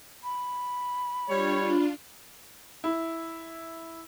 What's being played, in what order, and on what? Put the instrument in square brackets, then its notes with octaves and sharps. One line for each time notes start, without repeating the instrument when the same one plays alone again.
[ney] B5
[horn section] G3 C#5 [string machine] D4 F4
[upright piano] E4